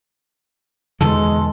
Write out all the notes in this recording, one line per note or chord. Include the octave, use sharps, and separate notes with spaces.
E2 B2 D3 D#3 G#3 A4